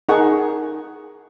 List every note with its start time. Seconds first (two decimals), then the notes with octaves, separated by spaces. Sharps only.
0.09 D#4 G#4 A#4 F#5 C#6